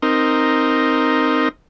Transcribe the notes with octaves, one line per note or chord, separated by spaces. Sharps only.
C4 D#4 A#4